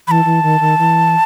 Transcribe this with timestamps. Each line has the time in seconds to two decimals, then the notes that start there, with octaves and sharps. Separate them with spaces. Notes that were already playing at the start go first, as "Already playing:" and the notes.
0.08 E3 A5 B5
0.25 E3
0.42 D#3
0.60 D#3
0.78 E3